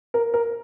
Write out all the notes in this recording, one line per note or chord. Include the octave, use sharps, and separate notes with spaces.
A#4
A#4